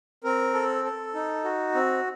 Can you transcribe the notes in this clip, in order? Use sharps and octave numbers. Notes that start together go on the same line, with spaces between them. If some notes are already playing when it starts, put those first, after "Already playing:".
C4 A#4
A4
A4
D#4
F#4
C4